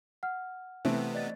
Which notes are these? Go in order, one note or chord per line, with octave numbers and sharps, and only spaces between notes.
F#5 F6
C3 E3 A3 B3 C4
D5 D#5 A6